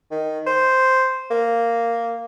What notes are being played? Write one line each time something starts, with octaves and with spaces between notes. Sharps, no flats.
D#3
C5
A#3